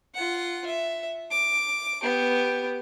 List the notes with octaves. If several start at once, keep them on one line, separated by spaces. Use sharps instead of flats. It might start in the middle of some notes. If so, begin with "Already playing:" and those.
F4 F#5
E5
D6
B3 G4